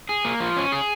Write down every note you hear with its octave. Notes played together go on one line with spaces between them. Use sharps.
G#4
A#3
F3
C#4
G#4